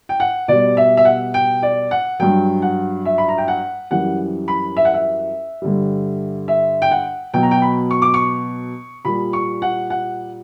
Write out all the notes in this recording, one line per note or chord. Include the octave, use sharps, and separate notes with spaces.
G5
F#5
B2 G3 D5
E5
E5
F#5
G5
D5
F#5
G2 F#3 G5
F#5
E5
B5
A#5
G5
F#5
F#2 E3 G3 F#5
B5
E5
F#5
E5
G2 D3 G3
E5
G5
F#5
B2 F#3 G5
A#5
G5
B5
C#6
D6
C#6
A#2 G3 B5
C#6
F#5
F#5